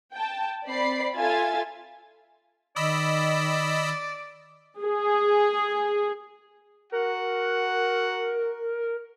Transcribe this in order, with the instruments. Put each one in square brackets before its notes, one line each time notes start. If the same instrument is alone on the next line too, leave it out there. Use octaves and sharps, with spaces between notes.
[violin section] G5 A5
C4 D5 B5 C7
F4 A4 E5 G#5 A6
[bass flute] D#3 [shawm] D5 [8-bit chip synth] D#5 B5 E6
[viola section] G#4
[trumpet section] F#4 F#5 [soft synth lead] A#4